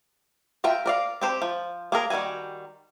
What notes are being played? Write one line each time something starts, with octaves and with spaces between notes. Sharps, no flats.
F4 A#4 E5 G5
A#4 D5 F5
C4 G4 C5
F3
A#3 G#4 A#4
D#3 G3 A#3 F#4 G#5